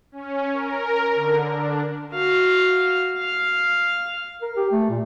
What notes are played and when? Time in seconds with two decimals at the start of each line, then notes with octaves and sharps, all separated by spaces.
0.12 C#4
0.53 A#4
1.15 D3
1.52 D4
2.14 F#4 F5
3.18 F5
4.42 A#4
4.57 G4
4.72 A3
4.90 A#2